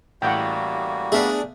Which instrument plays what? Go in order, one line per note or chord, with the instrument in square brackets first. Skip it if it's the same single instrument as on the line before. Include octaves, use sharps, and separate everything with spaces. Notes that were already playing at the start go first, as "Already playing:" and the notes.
[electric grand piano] A1 A2 [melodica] G3 A#3 F#4 [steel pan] F#5 G5
[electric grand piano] A3 B3 [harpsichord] D4 G#4 [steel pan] E5 F5